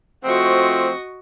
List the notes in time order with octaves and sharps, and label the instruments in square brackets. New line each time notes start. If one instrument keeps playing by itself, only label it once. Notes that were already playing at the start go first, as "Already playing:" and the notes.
[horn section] F3 A3 C4 [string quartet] F#4 D#5 C#6